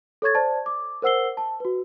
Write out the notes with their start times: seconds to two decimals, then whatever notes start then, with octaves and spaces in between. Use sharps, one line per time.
0.22 A4 C#5 C#6 G#6 A6
0.35 C5 D5 A5
0.66 D6
1.02 A#4 C5 F#5 E6 C7 G7
1.37 A5
1.60 F#4 B4